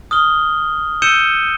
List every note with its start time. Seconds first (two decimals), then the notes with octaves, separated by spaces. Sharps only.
0.11 D#6 F6 G7
1.02 E6 G6 C#7 D#7 E7 G7